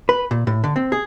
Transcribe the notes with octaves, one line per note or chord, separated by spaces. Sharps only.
B4
A#2
A2
D3
C4
G#4